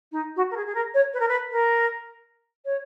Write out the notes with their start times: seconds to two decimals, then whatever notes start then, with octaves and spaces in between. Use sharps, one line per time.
0.11 D#4
0.36 F#4
0.51 A#4
0.56 G#4
0.66 G#4
0.74 A#4
0.94 C#5
1.13 B4
1.19 A#4
1.28 B4
1.51 A#4
2.65 C#5